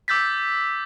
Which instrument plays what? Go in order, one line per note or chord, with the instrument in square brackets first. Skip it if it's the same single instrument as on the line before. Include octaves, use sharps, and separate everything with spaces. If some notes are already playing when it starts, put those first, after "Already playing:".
[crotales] D6 E6 G6 A6 B6